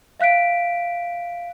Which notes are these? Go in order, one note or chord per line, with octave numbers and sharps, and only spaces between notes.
E5 F5 F#6 B6 D7